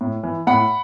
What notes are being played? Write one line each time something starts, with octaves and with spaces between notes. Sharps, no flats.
A2
E3
A2 F#5 B5